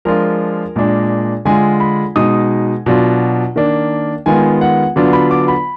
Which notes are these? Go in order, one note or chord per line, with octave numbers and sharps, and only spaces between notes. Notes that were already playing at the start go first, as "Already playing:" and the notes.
F3 G#3 D4 F4 A#4
A#2 G#3 D4
D3 G#3 D4 F4 G#5
B5
B2 G#3 D#4 D#6
B2 F#3 D4 F4
D#3 A#3 D4
D#3 G#3 B3 F4 G#5
F#5
D3 F#3 B3 D4 F4
B5
D6
B5